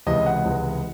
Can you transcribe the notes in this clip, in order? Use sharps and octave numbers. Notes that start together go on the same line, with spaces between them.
C#2 C3 E3 G#3 D#5
F#5
C#2 C3 E3 G#3